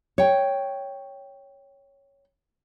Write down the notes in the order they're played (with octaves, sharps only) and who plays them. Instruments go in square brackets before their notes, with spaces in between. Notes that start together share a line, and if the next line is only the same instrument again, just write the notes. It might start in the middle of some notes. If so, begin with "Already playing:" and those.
[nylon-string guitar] C#5 G5